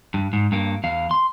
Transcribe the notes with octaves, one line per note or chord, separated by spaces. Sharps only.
G2
G#2
G2 A#3
E2 F5
C6